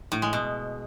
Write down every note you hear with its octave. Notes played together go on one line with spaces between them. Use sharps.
A2
G#3
B2